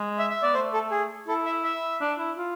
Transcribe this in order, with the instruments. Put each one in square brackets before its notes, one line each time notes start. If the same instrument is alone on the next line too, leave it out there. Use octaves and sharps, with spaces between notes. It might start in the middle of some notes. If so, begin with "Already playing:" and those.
Already playing: [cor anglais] G#3
[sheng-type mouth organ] E5
E5
[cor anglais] B3 [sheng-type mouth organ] D5
[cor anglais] A3 [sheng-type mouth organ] C5
[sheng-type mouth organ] A4
G#4
[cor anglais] E4 [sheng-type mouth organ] A4
[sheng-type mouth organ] E5
E5
[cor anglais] D4
E4
F4